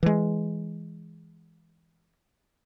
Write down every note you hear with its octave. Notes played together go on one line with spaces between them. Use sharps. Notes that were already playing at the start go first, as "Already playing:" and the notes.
E3 G#3